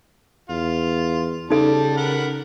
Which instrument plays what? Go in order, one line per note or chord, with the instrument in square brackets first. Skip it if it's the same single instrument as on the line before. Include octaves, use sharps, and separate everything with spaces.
[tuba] E2 [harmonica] F4
[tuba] C#3 [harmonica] G3 A5 [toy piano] D#4 A4
[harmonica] A#4 F#5 B5